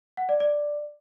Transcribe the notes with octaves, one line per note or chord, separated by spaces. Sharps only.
F#5
D5
D5